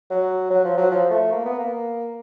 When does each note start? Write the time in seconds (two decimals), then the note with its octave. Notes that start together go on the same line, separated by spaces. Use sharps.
0.10 F#3
0.50 F#3
0.65 F3
0.77 F#3
0.91 F3
1.10 A3
1.32 A#3
1.45 B3
1.59 A#3